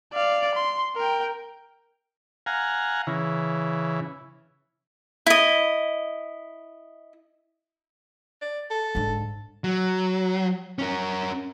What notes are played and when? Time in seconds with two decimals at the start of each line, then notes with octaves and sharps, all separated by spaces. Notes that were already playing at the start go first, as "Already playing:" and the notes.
0.13 D5 F5
0.55 C6
0.96 A#4 G5
2.46 F5 F#5 G#5 A#5
3.07 C#3 E3
5.26 E4 D#5
8.41 D5
8.70 A4
8.95 G#2 D3
9.64 F#3
10.79 C#4 A#4